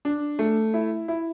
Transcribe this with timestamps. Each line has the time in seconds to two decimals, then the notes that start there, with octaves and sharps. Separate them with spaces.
0.05 D4
0.39 A3
0.74 E4
1.08 E4